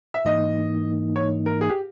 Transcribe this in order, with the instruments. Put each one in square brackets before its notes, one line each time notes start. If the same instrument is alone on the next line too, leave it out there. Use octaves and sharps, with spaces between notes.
[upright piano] E5
[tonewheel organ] G#2 E3 A#3 D#4 [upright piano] D#5
[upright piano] C#5
A#4
G#4
G4